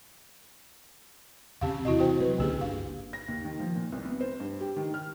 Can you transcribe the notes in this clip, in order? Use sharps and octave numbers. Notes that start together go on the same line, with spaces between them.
E2 C#3 C4 G4 F5
C3 E3 E4 F#4 D#5
F#4 C5 G5
F#3 A3 B4
C#2 D3 A#3 C#4 G4 G#4
G1 D4 F5
A#6
D#2
D#3
F3
A#2
C2
B3
C5
G2
G4
D#3
F6